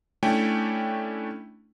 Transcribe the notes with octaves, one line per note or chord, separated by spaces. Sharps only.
A3 C#4 D4 E4 G5